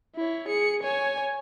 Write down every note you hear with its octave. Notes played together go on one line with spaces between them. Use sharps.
E4 C#5
G#4 C#7
C#5 G#5